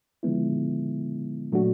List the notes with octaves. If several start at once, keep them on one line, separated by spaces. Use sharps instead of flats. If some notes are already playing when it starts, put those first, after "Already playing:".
D3 F3 G#3 B3 E4
A#2 F#3 A3 D4 F#4